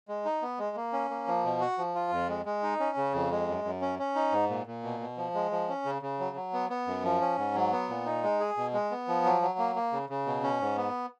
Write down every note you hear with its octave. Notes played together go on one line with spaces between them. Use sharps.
G#3
D#4
B3
G#3
A#3
C#4
A#3
F3
B2
F#4
F3
F4
F2
G#3
G#3
D#4
C#4
C#3
F2
G#3
F#2
F#2
C#4
C#4
D#4
G#2
A#2
A#2
B2
B2
F3
G#3
F3
C#4
C#3
C#3
F#3
F#3
B3
B3
F#2
F3
C#4
G#2
F#3
B3
A#2
D#4
G#3
G#4
B2
G#3
B3
F3
F#3
F#3
A#3
A#3
C#3
C#3
B2
C#4
G#2
B3